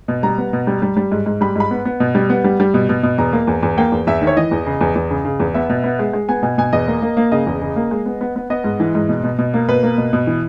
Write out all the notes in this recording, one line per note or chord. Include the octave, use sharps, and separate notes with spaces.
B2
G3 A#5
B3
B2
G3
G3
G3
G#2
G#2
G3 B5
G#2 B5
B3
B3
B2
G3
B3
G3
G3
B2
B2
B2
E2 A#5
A#3
E2
E2
A#3 G5
E2
E2 E5
D#3
C#5
E3 D#5
E2
C#3
E2
E2
C#3
C#3
E2
B3 E5
B2
B3
G#3
G#3
B3 G#5
B2 G#5
B2 G#5
E2 D#5
A#3
A#3
A#3
C#3 D#5
E2
C#3
A#3
G#3
B3
B3
B3
B3 D#5
G#2
E3
G#2
B2
B2
B2
A#3
B2 B4
A#3
B2
B2
E3